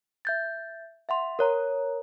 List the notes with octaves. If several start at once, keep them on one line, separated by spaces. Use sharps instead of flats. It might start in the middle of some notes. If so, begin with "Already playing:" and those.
E5 G6 A6
E5 F#5 C6
A#4 C#5 A#5